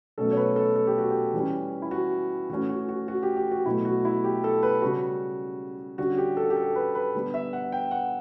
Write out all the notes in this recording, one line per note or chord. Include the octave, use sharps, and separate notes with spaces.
B2 F#3 A3 C#4 A4
C#5
B4
A4
A4
G4
F#4
G4
E3 G3 C#4
E4
F#4
E3 A3 C#4 F#4
F#4
F#4
F#4
G4
G4
F#4
B2 F#3 A3 E4
F#4
E4
G4
A4
B4
C#3 G3 C#4 F#4
D3 G3 C#4 F#4
G4
A4
G4
A4
B4
B4
D3 G3 B3
E5
F#5
G5
F#5